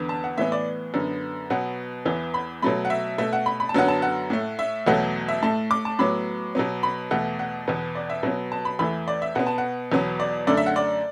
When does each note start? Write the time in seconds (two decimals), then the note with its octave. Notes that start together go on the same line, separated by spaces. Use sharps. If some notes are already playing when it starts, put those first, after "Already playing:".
Already playing: E2 D3 B3
0.09 A5
0.24 F#5
0.38 A2 E3 B3 E5
0.52 D5
0.94 F#2 D3 B3
1.50 B2 F#3 B3 F#5
2.05 E2 E3 B3
2.34 B5
2.62 B2 F#3 A3 B5
2.85 F#5
2.90 E5
3.18 B2 A3 E5
3.33 F#5
3.46 B5
3.60 B5
3.69 A5
3.74 F#2 D3 F#3 B3 F#5
3.88 A5
4.02 F#5
4.30 A2 A3
4.59 E5
4.87 E2 B2 F#3 A3 F#5
5.28 E5
5.42 A2 A3 A5
5.71 D6
5.85 A5
5.99 A2 F#3 B3 B5
6.55 B2 F#3 B3
6.83 B5
7.11 E2 B2 A3 F#5
7.39 F#5
7.68 E2 B2 B3
7.95 D5
8.10 E5
8.23 B2 F#3 B3
8.52 A5
8.65 B5
8.79 E2 E3 A3 B5
9.08 D5
9.22 E5
9.35 B2 B3 F#5
9.47 A5
9.58 F#5
9.92 E2 B2 F#3 B3
10.20 D5
10.47 F#2 D3 A3 D5
10.57 E5
10.66 F#5
10.76 D5